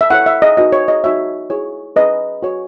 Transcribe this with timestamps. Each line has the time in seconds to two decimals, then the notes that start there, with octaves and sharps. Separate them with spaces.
0.01 E5
0.10 E4 A4 C#5 F#5
0.26 E5
0.42 D#5
0.57 D#4 F#4 B4 D#5
0.72 C#5
0.88 D#5
1.04 D#4 F#4 C#5 E5
1.50 E4 G#4 C#5
1.96 C#4 G#4 B4 D#5
2.42 F#4 C#5